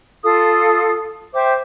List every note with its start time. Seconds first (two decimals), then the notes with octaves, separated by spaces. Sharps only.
0.23 F4 A4 F5 D#6
1.34 C5 E5 G5 D6